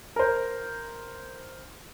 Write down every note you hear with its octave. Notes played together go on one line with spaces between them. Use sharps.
A#4 C5